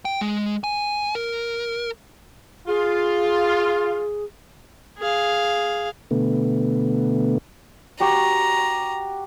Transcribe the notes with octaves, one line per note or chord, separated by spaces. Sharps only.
G5
G#3
G#5
A#4
F4 G#4
G#4 F5
B2 D3 A3 B3
F#4 G4 A#5 C#6